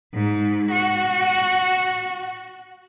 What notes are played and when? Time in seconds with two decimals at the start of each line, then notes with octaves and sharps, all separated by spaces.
0.14 G#2
0.70 F#4